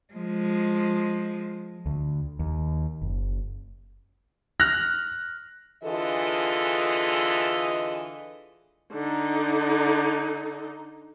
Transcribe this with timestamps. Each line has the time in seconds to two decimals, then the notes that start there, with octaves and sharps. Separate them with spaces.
0.14 F3 G#3
1.86 D2
2.39 D#2
3.02 F#1
4.60 F6 F#6 A#6
5.83 D3 E3 F4 G#4 A4 D#5
8.93 D3 D#4